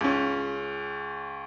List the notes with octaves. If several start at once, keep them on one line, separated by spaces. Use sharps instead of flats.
C#2 C#4